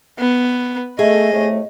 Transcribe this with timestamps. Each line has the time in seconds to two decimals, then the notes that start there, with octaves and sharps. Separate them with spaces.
0.18 B3
0.99 A3 G#4 D#5
1.32 A2 C3 A3